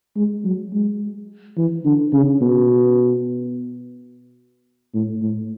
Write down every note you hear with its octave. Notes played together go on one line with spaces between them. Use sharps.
G#3
F#3
G#3
E3
D3
C#3
B2
A2
A2